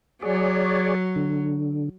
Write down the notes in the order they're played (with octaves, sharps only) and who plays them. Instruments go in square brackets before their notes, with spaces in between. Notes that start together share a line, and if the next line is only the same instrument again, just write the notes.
[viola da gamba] F#3 [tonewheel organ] G#4 C#5 D5
[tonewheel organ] D3